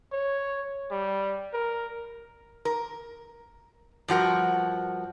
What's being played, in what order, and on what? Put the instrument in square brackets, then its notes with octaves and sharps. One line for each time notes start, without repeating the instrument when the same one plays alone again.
[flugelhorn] C#5
G3
A#4
[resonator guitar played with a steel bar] A#4
G2 F3 F#4 A#4